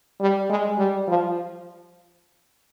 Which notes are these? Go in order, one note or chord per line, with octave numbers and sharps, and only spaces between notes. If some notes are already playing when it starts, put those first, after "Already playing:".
G3
G#3
G3
F3